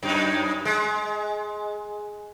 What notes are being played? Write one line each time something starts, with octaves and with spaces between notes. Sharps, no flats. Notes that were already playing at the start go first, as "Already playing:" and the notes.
F#2 D#4
G#3